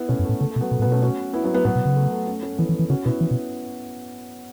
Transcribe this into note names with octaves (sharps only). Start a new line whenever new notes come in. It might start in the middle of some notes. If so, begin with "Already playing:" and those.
Already playing: B3 E4
B2 A3 C#4
F#2
A2 A3
C#3 A3
A3
B2
F#3 B3
B2 A3
A2 F#3 B3
B2 A3 C#4
C#4 F#4
B3 E4
F#3 B3
F#3 B3
A2 F#3 B3
B2
C#3
A3
A3
A3 C#4
A3 C#4
E3 B3 E4
E3
E3
C#3 C#4 F#4
B2 B3 E4
E3
B2